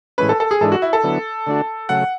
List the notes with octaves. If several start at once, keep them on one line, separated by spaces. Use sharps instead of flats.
A2 E3 G#3 C#4 B4
A4
A4
G#4
G#2 E3 G#3 D4 A4
F#4
E4
A4
D3 F#3 B3 E4
D3 A3 D4 F#4
C#3 F#3 A3 F#5